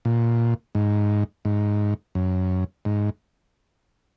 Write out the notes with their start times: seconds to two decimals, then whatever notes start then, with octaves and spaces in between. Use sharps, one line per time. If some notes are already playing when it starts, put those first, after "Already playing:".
0.05 A#2
0.75 G#2
1.45 G#2
2.15 F#2
2.85 G#2